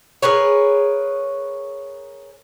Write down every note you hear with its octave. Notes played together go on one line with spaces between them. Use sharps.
G#4 A#4 B4 C#5